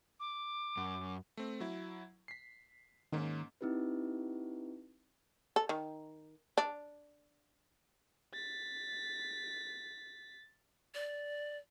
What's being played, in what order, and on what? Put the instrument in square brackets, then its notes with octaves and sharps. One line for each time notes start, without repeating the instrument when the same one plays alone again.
[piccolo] D6
[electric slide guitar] F#2
[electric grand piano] A3 C4
F#3 E4
B6 C7
[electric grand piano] G#2 A#3 C#4 [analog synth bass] D#3
[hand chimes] C4 D#4 E4 G4 B4
[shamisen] A4
D#3
D4
[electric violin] A6 B6
[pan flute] D5